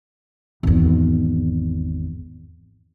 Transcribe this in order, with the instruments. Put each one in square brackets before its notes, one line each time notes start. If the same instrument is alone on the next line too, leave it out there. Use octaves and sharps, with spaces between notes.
[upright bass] G#1 E2